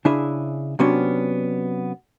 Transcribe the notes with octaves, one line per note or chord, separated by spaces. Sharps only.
C#3 D4 E4 G#4 E5
C3 F#3 B3 C#4 D4